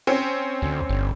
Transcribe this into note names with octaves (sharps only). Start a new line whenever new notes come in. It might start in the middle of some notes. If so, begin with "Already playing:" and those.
C4 C#4
D2
G1